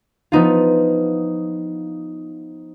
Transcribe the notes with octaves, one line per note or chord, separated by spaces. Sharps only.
F3 B3 D#4 F4